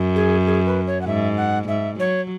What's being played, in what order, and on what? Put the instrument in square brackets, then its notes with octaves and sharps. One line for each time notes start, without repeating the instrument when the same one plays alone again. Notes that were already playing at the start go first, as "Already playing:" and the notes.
Already playing: [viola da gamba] F#2
[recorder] G#4
G#4
B4
C#5
F#5
[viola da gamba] G#2 [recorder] E5
[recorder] F#5
[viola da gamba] G#2 [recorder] E5
[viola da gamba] F#3 [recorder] C#5